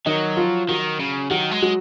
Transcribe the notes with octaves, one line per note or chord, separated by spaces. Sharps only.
D#3 F#3 D#4
F3 F4
D#3 F#3 F#4
C#3
D#3 F#3 F#4
G#3
F#3 F#4